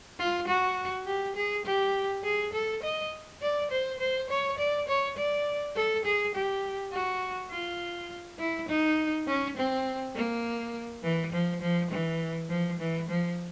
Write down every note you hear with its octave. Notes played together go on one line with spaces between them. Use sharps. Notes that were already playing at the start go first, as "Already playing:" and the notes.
F4
F#4
G4
G#4
G4
G#4
A4
D#5
D5
C5
C5
C#5
D5
C#5
D5
A4
G#4
G4
F#4
F4
E4
D#4
C#4
C4
A#3
E3
F3
F3
E3
F3
E3
F3